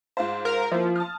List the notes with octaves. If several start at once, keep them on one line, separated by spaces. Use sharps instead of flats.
G#2 F4 C5
A#4
F3 A#3 E4
A5 D#6 F6